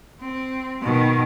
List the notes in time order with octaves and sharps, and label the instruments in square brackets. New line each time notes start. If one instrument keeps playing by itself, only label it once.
[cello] C4
B2 D#3